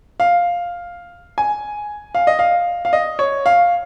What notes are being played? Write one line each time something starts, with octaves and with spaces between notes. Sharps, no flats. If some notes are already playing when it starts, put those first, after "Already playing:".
F5
G#5
F5
D#5
F5
F5
D#5
C#5
F5